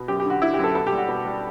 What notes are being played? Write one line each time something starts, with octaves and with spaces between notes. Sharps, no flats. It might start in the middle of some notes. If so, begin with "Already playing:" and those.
Already playing: B2
F#2 G4
G4
D3
F#4
D3 E4
G4
F#2 A4
B2 A4
G4
G3
F#4
B2
G3